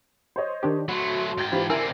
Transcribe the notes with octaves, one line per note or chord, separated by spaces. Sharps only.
C5 C#5 D#5
D#3 D4 G4
F#3 A3 F#4 B5 C6
G#2 G5 F6 G#6 A6
E3 F4 G4 C5 B5
D3 C4 E4 A#4 G#5 E6